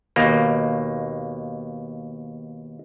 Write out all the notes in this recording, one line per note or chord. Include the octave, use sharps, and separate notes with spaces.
D#2 B2 A#3